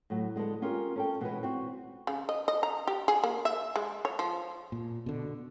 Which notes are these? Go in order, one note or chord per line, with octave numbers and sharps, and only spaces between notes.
A2 F#3
D3 G#3 B3 A4
C#4 F4 G4 G#4 A#4
C#4 A4 G5
B2 E3 G#3 B3 C#4 B4
C4 F#4
C#3
D#5
D#5
A#5
G4
G#4
A#3
E5
G#3
C#5
F3
A#2
B2 D3